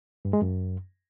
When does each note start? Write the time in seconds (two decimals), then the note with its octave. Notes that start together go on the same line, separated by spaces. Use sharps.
0.25 G2
0.33 G#3
0.42 F#2